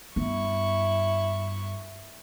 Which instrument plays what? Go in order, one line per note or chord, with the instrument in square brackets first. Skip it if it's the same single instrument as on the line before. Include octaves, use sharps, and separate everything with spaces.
[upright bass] G2 B3 [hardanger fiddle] E4 C#6